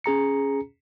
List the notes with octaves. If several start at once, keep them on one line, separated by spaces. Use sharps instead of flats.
C#4 G#4 A#5 C#7